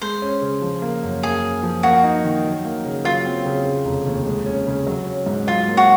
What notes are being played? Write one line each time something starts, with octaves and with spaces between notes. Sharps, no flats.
G#3 C5
C#4
C#3
F3
A#3
F#2
A#3 G#4
C#4
F3
A#3 F#4
D#4
D#3
F#3
A#3
C#3
F#3 F4
C4
C#3
C#3
F1
D#2
G#3
C#4
C#3
F#3
C#4
G#2
F#3 F4
A#3
F#4